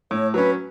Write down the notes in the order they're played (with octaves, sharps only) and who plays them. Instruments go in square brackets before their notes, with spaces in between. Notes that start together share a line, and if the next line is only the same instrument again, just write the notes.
[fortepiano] A2 [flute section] C#5
[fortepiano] F#3 C#4 [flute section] B4